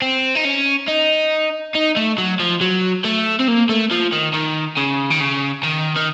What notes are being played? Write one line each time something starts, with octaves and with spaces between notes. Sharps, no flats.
C4
D#4
C#4
D#4
D#4
A3
F#3
F3
F#3
A3
C4
A#3
A3
F3
D#3
D#3
C#3
D#3
C#3
D#3
D#3